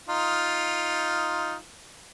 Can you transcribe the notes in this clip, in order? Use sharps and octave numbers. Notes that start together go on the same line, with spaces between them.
D#4 F4